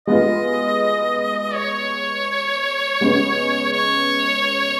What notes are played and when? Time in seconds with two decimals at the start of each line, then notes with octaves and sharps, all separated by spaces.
0.07 G#3 B3 F4 D#5
1.54 C#5
3.01 C#3 G#3 B3
3.73 C#5